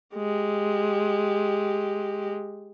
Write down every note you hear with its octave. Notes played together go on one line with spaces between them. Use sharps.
G#3 G4